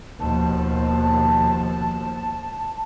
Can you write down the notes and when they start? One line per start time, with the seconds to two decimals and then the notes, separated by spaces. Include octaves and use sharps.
0.20 D#2 B2 F3 A5